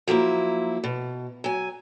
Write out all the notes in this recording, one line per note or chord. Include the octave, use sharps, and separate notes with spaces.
F3 F#3 A#3 E4
B2
F#3 G#5